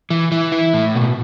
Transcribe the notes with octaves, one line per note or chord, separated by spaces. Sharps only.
E3
E3
E4
A2
B2